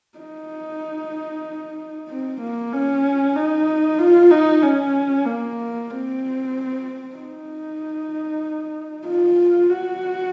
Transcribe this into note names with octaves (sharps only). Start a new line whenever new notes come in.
D#4
C4
A#3
C#4
D#4
F4
D#4
C#4
A#3
C4
D#4
F4
F#4